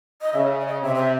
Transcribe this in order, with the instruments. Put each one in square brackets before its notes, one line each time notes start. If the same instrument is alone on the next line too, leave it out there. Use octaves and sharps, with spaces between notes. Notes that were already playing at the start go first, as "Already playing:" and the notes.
[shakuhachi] D#5
[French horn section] C#3 [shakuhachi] E5
[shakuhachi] D5
D#5
[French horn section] C3 [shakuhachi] E5
[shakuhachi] E5